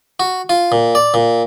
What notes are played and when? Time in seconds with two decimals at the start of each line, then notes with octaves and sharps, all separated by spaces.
0.20 F#4
0.49 F4
0.72 A#2
0.95 D5
1.14 A#2